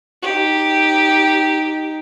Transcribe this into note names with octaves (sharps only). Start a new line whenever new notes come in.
D#4 G4